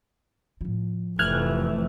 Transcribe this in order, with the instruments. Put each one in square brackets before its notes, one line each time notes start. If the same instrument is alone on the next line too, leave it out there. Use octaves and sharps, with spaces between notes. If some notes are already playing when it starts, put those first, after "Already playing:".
[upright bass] A2 F3
[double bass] F1 F2 [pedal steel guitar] E3 A3 [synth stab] F6 F#6 G#6